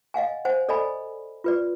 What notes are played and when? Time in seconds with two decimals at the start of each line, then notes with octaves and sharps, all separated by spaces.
0.14 D#5 F5 F#5 G#5
0.45 C5 F#5 G#5
0.69 A4 D5 D#5 G#5 B5
1.44 F4 B4 D5